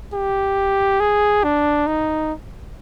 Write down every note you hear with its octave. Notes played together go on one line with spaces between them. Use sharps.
G4
G#4
D4
D#4